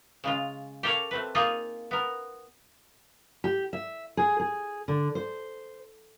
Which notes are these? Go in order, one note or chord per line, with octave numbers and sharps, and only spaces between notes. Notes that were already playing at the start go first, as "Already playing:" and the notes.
C#3 G#3 F4
G4 A4 A#4 C#5 D5 F5
A3 C4 B4
A#3 D#4 F4 G#4 D#5
B3 A#4
G4
E5
G#4
G#4
D3
C5